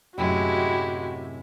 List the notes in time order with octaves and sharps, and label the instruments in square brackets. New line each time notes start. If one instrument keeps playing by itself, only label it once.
[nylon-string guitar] F#2 A2 C3 [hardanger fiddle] G#3 E4 [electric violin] F#4 G4